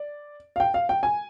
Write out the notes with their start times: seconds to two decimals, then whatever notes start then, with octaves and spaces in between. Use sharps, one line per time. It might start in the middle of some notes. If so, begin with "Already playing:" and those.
Already playing: D5
0.56 F5
0.60 G5
0.74 F5
0.89 G5
1.03 G#5